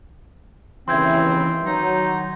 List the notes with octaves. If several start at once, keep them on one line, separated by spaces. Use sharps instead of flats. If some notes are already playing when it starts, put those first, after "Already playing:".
D#2 C#3 E3 C4 C6 G6 G#6
D#3 F#3 D#4